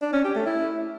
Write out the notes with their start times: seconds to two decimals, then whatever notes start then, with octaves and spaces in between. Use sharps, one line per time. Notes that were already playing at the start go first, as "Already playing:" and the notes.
0.02 D4
0.13 C#4
0.24 G4
0.35 A3
0.46 E4